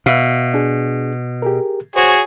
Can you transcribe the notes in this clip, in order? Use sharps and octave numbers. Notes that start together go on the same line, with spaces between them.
B2 E5 F5
D4 G#4
G4 G#4 A#4
F#4 G#4 C5 C#5